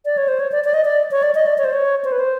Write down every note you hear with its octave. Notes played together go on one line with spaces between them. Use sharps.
D5
C#5
C5
C#5
D5
D5
D#5
D5
C#5
D5
D#5
D5
C#5
C5
C#5
C5
B4
C5